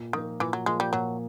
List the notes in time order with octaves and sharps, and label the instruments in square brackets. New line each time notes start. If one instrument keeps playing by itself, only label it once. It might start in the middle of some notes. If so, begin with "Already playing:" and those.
Already playing: [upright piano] A#2
[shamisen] D#3 [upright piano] F3 A#3
[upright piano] A#2 [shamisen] E3
[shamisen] F#3
[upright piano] F3 A#3 [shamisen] G#3
[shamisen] G3
[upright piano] A#2 [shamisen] F#3